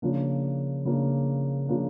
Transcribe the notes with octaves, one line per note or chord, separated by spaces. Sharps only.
C#3 F3 A#3 D4
C#3 F3 A#3 D4
C#3 F3 A#3 D4